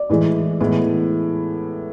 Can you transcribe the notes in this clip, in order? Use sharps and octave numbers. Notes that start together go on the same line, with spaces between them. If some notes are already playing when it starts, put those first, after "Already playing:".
Already playing: D5
A2 E3 G#3
A2 E3 G#3 B3